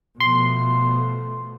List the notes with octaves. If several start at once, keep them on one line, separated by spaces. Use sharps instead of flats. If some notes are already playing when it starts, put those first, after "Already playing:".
B2 F3 A3 C6